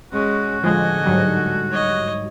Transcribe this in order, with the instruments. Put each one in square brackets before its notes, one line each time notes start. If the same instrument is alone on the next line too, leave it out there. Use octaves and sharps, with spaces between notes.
[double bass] G#3 C#4 [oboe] F#4
[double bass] A2 D3 [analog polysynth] F3 G#3 [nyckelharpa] D#5 G#5
[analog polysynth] G#2 F#3 G3
[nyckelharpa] C#5 D#5